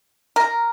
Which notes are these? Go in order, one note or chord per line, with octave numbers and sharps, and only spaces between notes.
A#4